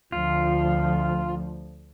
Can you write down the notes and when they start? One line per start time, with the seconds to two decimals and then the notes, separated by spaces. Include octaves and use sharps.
0.12 D2 F3 F4